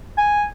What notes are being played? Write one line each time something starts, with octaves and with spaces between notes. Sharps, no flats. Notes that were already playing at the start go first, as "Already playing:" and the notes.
G#5